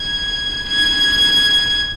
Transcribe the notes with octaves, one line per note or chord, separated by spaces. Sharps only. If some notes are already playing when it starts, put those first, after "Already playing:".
Already playing: G#6
G#6